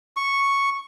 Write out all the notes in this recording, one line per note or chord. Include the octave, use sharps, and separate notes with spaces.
C#6